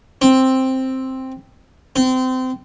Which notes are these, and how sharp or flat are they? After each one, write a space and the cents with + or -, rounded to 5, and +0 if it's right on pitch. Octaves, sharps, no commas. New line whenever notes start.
C4 +5
C4 -25